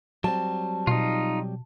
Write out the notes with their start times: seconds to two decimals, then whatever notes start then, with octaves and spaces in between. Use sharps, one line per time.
0.24 F#3 G3 C4 A5
0.87 B2 D#4 F4